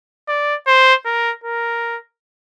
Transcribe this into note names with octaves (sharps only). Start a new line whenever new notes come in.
D5
C5
A#4
A#4